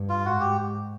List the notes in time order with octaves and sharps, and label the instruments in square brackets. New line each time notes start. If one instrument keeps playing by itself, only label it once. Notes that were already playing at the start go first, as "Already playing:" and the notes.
Already playing: [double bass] G2
[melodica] F4
[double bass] G#2 [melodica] F#4
[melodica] G4